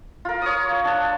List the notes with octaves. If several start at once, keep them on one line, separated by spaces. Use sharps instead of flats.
F4 A#4
C#5 D#6
D4 A5